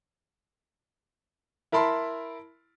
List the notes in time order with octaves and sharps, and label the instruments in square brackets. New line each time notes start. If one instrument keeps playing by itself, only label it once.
[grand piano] E4 A#4 A5 B5 C6